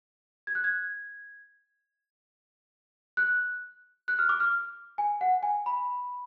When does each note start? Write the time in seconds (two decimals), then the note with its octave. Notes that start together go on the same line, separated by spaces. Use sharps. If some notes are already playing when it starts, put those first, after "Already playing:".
0.47 G#6
0.55 F#6
0.64 G#6
3.17 F#6
4.08 F#6
4.19 F6
4.29 D6
4.40 F6
4.98 G#5
5.21 F#5
5.43 G#5
5.66 B5